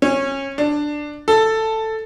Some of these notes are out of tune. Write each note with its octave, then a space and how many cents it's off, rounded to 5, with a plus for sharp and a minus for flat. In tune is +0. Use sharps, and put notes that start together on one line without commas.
C#4 -20
D4 +10
A4 +5